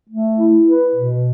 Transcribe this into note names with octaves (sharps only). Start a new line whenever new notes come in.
A3
E4
B4
B2